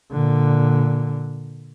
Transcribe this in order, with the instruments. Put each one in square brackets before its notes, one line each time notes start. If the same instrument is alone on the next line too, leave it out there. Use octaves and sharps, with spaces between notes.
[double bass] A#2 D3